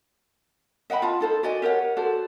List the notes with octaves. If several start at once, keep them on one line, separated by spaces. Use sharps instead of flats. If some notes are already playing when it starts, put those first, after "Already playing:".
D#5 F#5 G5 B5
F4 A5
D#4 A4 C5
F#4 D5 D#5 G#5
G4 A#4 C#5 F#5
F#4 A4 C5 D5